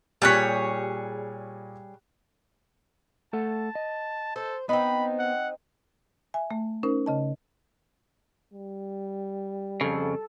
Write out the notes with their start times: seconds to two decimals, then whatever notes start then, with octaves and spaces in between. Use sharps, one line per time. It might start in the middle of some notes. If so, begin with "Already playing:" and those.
0.22 A#2 G3 G#4 C#5 F#6 B6
3.33 A3 A4 F#5 A5
3.75 D#5
4.36 A4 C5
4.69 B3 C4 D#4 B5
5.19 F#5
6.34 E5 G#5
6.51 A3
6.83 C#4 D#4 A#4 C5
7.06 C#3 D#5 A5
8.53 G3
9.81 F2 C#3 A4